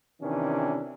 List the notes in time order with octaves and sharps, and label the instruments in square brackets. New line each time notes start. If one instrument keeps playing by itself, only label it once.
[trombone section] C3 D#3 E3 C#4 D4